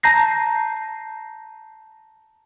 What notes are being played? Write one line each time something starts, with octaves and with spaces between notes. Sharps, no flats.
A5 A#5 G6 A#6 C7